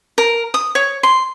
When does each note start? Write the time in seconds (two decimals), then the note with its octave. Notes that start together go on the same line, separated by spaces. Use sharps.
0.18 A#4
0.54 D#6
0.75 C#5
1.03 C6